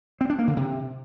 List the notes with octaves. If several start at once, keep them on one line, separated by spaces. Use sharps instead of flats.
C4
D4
A#3
D3
C3